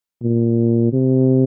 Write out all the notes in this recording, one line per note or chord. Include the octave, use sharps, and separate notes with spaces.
A#2
C3